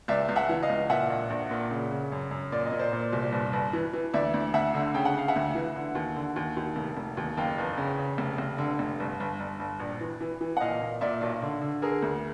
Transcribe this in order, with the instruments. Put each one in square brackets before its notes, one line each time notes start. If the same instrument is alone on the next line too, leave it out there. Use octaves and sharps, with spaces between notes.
[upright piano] C#2 D5 E5
C#2
E5 F#5
E3
D#5 F5
C#2
A#2 E5 F#5
A#1
A#1
A#2
C#3
C#3
F#2
F#2
A#2 D5
D#5
A#2
C5 D5
A#2
C2
G1
G1
E3
E3
D2 D5 E5
D2
D2 E5 F#5
D3
C#3 G5
F#5
C#3 F5
E5 F#5
D2
E3
D3
D#2
D3
D#2
D#2
F1
F1
D#2
F#1 F5 G5
E2
C#3
C#3
F1
F1
D3
F1
G1
G1
G1
G1
A#1
E3
E3
E3
F#5
A#2 D#5 F5
A#2
A#2 D5 E5
B1
D3
D3
D3 G#4 A#4
D2